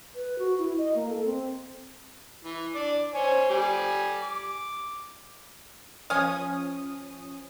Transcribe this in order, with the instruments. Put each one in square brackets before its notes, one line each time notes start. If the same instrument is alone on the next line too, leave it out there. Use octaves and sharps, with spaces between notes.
[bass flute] B4
F#4
E4
D#5
A#3
A4
C4
[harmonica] E3
D4 D6
C5 C#5 G#5
G3 G#5 D6
D6
[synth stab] F3 C#4 D#6 [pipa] F5 G#5